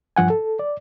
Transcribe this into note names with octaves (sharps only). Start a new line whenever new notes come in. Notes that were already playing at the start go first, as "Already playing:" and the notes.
G2 F3 F#5 G#5
A4
D5